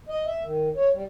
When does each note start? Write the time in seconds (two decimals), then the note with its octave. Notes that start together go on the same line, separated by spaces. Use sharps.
0.09 D#5
0.26 E5
0.43 D#3
0.76 C#5
0.93 G3